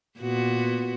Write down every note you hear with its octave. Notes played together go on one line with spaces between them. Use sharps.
A#2 B3 F#4